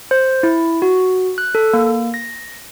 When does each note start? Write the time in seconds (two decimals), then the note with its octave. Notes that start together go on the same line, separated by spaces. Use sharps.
0.11 C5
0.43 E4
0.82 F#4
1.38 F#6
1.55 A4
1.73 A#3
2.14 A#6